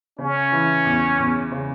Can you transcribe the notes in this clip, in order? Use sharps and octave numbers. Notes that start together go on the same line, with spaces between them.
C#3 C#4
E3
E2
E2
C#3